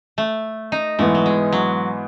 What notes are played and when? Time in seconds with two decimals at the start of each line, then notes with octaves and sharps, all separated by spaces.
0.18 A3
0.72 D#4
0.99 G#2 E3 A3 B3
1.15 F#3
1.26 G#3
1.52 F#3